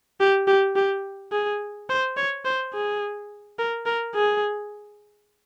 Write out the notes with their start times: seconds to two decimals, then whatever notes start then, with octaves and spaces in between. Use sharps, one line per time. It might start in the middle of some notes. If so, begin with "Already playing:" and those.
0.20 G4
0.48 G4
0.76 G4
1.32 G#4
1.89 C5
2.17 C#5
2.45 C5
2.74 G#4
3.59 A#4
3.86 A#4
4.15 G#4